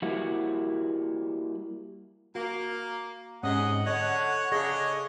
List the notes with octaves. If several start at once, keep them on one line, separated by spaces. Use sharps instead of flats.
G3 A#3 E4 F#4
A#3 F#4
G#2 C3 C#4 G#4 D#5 F#5
D3 C#5 D#5
C#3 D4 G#4 A4 C#5 D#5